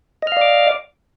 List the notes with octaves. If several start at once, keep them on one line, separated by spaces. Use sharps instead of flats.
D5 D#5 F5 D6 F6